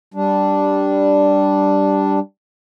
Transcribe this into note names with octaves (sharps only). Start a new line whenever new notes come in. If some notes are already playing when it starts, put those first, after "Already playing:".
G3 D4